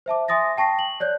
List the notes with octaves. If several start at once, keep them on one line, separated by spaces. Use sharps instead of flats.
C5 E5 A5 D6
E5 G#5 C6 D#6 A6 A#6
G5 A5 C#6 A#6 C7
F#7
C#5 D5 F#6 G6